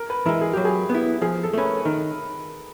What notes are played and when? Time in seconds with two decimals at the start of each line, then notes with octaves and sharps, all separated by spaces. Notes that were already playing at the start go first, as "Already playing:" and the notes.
Already playing: A#4
0.10 B4
0.26 E3 G#3 A#4
0.41 G#4
0.53 F#3 G4
0.65 G#4
0.90 B3 E4
1.22 F3 G#4
1.43 A4
1.53 A3 C#4 B4
1.64 A#4
1.85 D#3 A#4